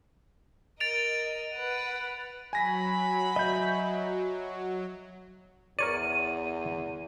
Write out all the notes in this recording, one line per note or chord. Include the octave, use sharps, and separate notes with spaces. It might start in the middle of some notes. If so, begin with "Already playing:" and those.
A#4 D#5 A6 D7 F7
B4 F#5
F#3 G#5 B5 A#6 B6
D#5 E5 G6
E2 A#4 C#5 D5 D#7